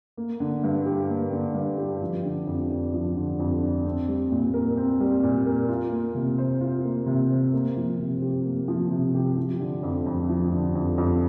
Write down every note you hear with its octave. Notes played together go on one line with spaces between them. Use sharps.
A#3
D3
G2
G4
A#3
D3
G2
G4
F3
D3
F2
D4
F3
D3
F2
D4
C4
G3
A#2
A#4
C4
G3
A#2
A#4
F4
A#3
C3
C5
F4
A#3
C3
C5
A#3
F3
C3
G4
A#3
F3
C3
G4
F3
D3
F2
F2
F3
D3
F2
F2